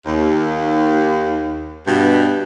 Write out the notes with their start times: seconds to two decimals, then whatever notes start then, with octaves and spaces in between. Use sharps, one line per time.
0.06 D#2
1.87 G2 B2